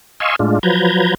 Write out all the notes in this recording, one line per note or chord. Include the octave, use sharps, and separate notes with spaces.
D#5 F5 G#5 C6 C#6 E6
A2 G#3 D4 F4
F3 F#3 B4 A#5 G6 G#6